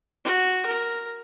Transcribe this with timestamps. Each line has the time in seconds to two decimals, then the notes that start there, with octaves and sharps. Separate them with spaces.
0.25 F#4
0.65 A#4